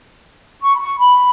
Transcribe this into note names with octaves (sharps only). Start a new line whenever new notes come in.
C#6
B5
C#6
B5